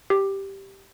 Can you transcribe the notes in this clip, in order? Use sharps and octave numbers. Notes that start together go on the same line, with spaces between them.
G4